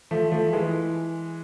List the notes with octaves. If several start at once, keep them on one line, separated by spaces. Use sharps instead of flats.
F3 A3
F3 A3
E3 G#3